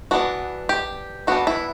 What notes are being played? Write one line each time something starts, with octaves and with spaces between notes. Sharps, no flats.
E3 B3 D4 F#4
G4
E3 B3 D4 F#4
E4